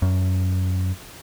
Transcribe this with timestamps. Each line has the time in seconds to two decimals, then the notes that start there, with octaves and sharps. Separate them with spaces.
0.02 F#2